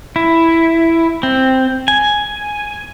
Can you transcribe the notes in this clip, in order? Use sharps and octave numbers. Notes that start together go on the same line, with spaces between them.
E4
C4
G#5